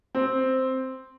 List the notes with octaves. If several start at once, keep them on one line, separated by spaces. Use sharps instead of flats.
C4